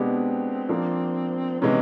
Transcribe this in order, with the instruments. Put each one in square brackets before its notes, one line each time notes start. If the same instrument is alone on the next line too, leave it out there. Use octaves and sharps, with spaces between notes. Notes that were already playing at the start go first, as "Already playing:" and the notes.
Already playing: [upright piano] B2 G#3 B3 D4 G4 [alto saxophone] C4
[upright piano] F3 A#3 D4
[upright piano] C3 E3 G#3 B3 [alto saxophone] C#4